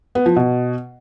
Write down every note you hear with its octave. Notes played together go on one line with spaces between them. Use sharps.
B3
F3
B2